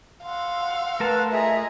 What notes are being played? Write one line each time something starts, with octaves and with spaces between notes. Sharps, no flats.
F5 F#5 C6 E6
A3 A#4 B4 A5
F4 G#4 D#5 E5 A#5